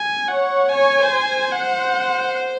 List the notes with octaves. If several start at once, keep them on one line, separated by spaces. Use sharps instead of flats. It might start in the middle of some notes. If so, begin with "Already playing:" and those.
Already playing: G#5
C#5 F#5
C#5 G#5
C5
F#5